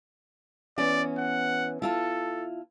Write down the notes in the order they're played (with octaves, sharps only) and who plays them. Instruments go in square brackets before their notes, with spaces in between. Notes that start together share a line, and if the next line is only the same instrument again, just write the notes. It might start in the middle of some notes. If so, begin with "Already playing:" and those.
[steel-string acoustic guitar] E3 B3 C#4 [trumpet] D5
[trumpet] F#5
[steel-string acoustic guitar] E4 F4 A5 [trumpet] A4